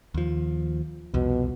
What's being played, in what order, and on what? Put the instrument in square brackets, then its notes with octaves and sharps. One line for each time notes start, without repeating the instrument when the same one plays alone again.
[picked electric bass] D#2 F3
[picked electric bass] C2 F2 [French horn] B2